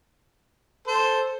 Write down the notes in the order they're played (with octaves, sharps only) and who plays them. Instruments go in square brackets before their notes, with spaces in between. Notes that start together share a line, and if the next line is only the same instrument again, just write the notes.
[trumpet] A4 [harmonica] C5